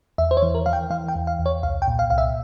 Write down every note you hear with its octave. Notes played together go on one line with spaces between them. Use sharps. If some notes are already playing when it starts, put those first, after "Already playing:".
E2 E5
C5
C#5
E3
A#4
E3 F5
G5
E3 F5
G5
E2
F5
E2
C#5
C2 F5
G5
A#2
F5
C2 F5
E5